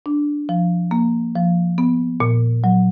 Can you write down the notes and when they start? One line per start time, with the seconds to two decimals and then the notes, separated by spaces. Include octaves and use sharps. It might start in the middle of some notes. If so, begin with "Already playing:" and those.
0.06 D4
0.49 F3
0.91 A#3
1.35 F3
1.78 B3
2.20 A#2
2.64 F#3